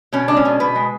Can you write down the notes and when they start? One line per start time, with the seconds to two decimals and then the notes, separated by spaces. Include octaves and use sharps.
0.12 B2 C#4
0.28 G#3 D4
0.37 C#4
0.45 B2
0.60 B2 B4
0.75 G#3